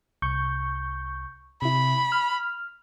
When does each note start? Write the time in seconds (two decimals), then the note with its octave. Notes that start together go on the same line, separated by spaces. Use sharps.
0.22 C2 C#6 G6
1.62 C3 E4 B5
2.12 F6